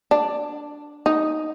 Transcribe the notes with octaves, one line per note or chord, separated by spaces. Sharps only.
D4
D#4